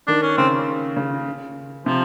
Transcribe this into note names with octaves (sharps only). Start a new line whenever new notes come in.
D#3 D4
C#4
C#3 C4
C#3
C3 F3